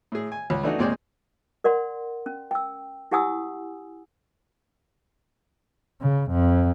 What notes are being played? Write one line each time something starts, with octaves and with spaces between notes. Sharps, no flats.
A2 G#4
G#5
C#2
E3 A3 D4 D#4 F#4
D#2 A#2 G#3 C4 D5
A#4 D5 F#5 C6
C#4
G5 E6
E4 G4 F#5 G#5 D#6 E6
C#3
F2